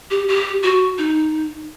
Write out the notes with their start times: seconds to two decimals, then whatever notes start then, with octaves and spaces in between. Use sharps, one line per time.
0.11 G4
0.28 G4
0.63 F#4
0.98 D#4